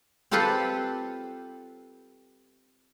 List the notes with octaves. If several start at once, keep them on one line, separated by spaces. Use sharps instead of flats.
C4 F4 G4 A4 B4 C5